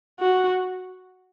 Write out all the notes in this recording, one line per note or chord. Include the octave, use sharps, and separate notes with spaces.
F#4